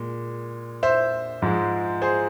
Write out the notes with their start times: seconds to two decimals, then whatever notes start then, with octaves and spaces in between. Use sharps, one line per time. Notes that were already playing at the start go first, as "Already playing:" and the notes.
Already playing: A#2 G#3
0.83 C5 E5
1.42 G#2 F3 G#3
2.02 G#4 C5